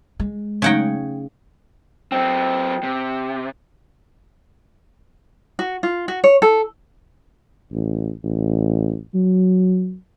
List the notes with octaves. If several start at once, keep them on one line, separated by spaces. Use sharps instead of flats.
G#3
C#3 F#3 A3 D#4 F#5 G5
F#3 C4 G5
C3
F#4
F4
F#4
C#5
A4
A1
A1
F#3